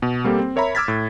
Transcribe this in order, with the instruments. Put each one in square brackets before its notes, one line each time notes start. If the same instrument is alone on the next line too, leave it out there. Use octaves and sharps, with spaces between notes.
[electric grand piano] B2
G3 A#3 C4 G4 A4
C4
A#4 C#5 E5 A#5 B5
D6 E6 F6 G#6 A6 B6
A2